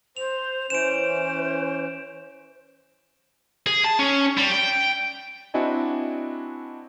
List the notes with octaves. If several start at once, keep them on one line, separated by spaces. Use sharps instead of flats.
C5 F7
E3 C#4 C5 D7 E7
G#4
A5
C#4
G3
G5
C4 D4 E4 F#4 D#5 G#5